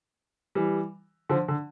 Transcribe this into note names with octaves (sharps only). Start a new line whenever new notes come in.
E3 G3
D3 F3
D3